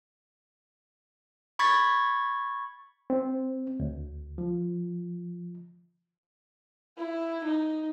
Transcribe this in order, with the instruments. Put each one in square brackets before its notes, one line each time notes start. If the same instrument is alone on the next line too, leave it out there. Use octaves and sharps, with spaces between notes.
[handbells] B5 C#6 G#6 A6 B6
[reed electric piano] C4
D2
F3
[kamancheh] E4
D#4